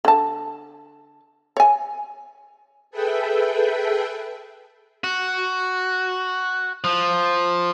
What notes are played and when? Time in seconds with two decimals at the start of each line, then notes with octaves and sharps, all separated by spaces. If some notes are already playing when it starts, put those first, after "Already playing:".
0.05 D3 A5
1.57 C#5 G#5
2.91 G#4 A4 B4 E5 G5
5.04 F#4
6.84 F3